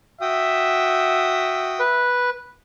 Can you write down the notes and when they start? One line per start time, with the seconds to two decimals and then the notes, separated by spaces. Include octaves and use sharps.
0.21 F#4 E5 G5 D#6
1.80 B4